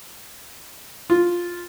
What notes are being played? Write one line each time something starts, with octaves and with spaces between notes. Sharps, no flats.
F4